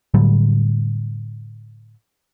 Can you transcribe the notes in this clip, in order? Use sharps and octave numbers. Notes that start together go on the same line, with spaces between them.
A2 D3 F#3 G3